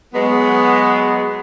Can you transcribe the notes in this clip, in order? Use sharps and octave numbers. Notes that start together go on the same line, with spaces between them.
F#3 G#3 B3